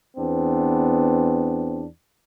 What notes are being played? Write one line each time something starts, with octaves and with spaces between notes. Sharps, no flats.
E2 B3 C4 D4